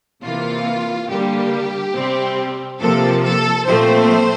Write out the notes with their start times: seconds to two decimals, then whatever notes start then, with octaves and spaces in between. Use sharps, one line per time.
0.23 C3 E3 A#3 F4
1.08 D3 G3 A#3 G4
1.94 C3 G3 C4
2.80 C3 F3 A#3 A4
3.24 A4
3.66 A#2 F3 A3 C4 C5